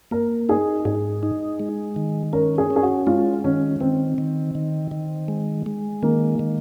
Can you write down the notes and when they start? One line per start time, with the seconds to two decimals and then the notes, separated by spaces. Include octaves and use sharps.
0.11 A#3 A#4
0.49 D#4 G#4
0.85 G#2 G#4
1.23 D#4
1.60 G#3
1.96 D#3
2.33 C#4 A#4
2.58 G#4
2.70 C#4
2.76 G#4
2.83 F#4
3.07 G#3 F4
3.44 D#3 C#4
3.81 D#3 C4
4.18 D#3
4.55 D#3
4.91 D#3
5.28 G#3
5.66 G#3
6.03 D#3 A#3
6.39 D#3